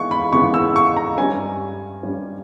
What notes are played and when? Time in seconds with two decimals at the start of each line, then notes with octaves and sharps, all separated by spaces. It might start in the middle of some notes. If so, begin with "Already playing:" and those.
Already playing: E3 G#3 B3 C#6
0.11 B5
0.33 C#3 E3 G#3 B3 C#6
0.54 E6
0.76 C#6
0.97 A#5
1.18 G2 G3 C#4 G#5
2.03 G2 G3 C#4